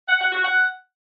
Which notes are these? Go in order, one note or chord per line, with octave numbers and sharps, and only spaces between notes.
F#5
F#5
F#4
F#5